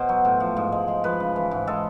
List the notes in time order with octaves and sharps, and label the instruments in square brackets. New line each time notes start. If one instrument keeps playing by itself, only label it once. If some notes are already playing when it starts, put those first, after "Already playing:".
Already playing: [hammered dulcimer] B2 C5
F#3
A2
F3
G#2
G#3
G#3
F3 B4
C#3
E3
G#2
G#3 A4